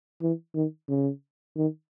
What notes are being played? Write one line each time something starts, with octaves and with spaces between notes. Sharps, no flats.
E3
D#3
C#3
D#3